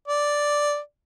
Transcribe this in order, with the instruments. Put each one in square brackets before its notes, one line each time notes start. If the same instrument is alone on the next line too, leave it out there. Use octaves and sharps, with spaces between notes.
[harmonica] D5